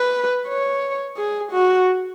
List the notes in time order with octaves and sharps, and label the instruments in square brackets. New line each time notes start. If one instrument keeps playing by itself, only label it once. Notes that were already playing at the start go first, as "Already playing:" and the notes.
Already playing: [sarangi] B4
C#5
G#4
F#4